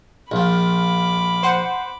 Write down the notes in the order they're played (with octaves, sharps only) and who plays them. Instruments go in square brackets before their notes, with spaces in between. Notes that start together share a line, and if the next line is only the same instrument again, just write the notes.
[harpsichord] A#1 F3 [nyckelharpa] B5 D6
[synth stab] C5 F#5